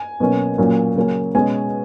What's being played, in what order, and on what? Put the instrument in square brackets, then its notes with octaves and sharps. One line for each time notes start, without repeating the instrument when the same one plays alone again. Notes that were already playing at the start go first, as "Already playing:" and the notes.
Already playing: [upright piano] G#5
B2 F#3 A#3 C#4
A#2 F#3 A#3 C#4
C#3 F#3 A#3 C#4
B2 G#3 C#4 G#5